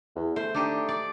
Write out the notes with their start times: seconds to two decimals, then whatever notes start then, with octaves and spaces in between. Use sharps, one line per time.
0.16 E2
0.36 A3 C5
0.54 D4 D#4 G4
0.89 D5